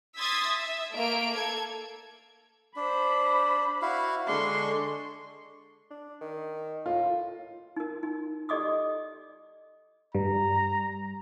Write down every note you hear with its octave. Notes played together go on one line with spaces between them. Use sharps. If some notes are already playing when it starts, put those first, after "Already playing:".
C6 D#6 E6 G#6 A6 B6
E5
A3 A#3 D7
A4 G#6
D4 C5 B5
E4 F#4 F5
D3 G#3 D4 C6 C#6
D4
D#3
A2 F4
D#4 A#4
D#4
G4 A4 D5 D#5 D6 D#6
G2 G3 A#5